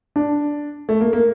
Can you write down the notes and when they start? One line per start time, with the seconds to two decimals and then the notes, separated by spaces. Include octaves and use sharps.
0.16 D4
0.89 A3
1.01 A#3
1.13 A#3